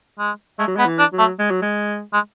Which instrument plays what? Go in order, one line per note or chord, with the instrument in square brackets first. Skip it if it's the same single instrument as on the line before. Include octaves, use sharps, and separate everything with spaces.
[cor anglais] G#3
[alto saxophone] G#3 [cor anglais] A3
[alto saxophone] F#3
G#3
[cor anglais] B3
[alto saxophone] E3
[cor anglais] D4
[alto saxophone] F#3
[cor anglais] A3
[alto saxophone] G#3
F#3
G#3
[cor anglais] G#3